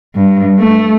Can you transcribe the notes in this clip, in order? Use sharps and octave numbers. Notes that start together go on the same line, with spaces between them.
G2
A3